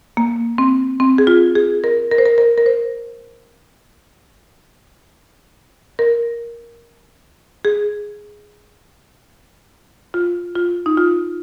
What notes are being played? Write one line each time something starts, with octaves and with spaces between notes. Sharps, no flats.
A#3
C4
C4
G#4
F4
G#4
A#4
A#4
C5
A#4
A#4
A#4
C5
A#4
G#4
F4
F4
D#4
F4